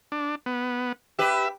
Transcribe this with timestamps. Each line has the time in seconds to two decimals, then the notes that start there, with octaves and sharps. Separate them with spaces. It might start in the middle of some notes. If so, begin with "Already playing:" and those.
0.12 D4
0.46 B3
1.19 G4 B4 E5